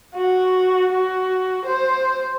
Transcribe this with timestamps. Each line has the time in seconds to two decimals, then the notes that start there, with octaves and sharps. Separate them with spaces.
0.16 F#4
0.92 F#4
1.65 C5